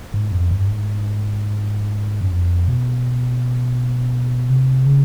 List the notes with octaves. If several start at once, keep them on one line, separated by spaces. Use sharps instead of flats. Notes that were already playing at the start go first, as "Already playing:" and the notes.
G#2
F2
G2
G#2
F#2
F2
B2
C3
C#3